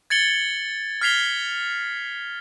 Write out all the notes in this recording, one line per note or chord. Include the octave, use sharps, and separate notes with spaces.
G#6 A6 C#7 F#7 G7
F6 G#6 B6 C7 F7 G7